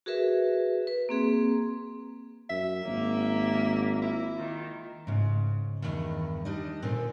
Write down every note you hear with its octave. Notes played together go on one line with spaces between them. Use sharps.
F#4 G#4 A#4 B4 E5
B4
A#3 C4 G#4
F#2 E5
G#1 A#3
E4
D#3 F4
G#2 C#3
E2 G2 D#3
G3 D4 D#4 D#5
A#2 D3 C4